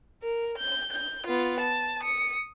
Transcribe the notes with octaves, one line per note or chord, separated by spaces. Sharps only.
A#4
G6
G6
B3 F4
A5
D#6 C#7